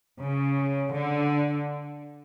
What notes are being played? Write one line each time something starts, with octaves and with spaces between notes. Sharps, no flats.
C#3
D3